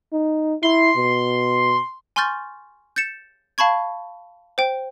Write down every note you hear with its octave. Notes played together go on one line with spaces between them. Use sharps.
D#4
E4 C6
B2
G#5 C6 C#6 F6 G6 A6
G6 A6 C#7 E7
F5 A5 B5 C#6 G#6
C5 G5